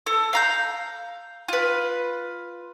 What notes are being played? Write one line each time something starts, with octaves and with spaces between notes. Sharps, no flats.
A4
F5 A#5 G6
F4 B4